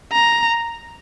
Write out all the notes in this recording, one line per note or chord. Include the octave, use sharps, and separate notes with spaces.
A#5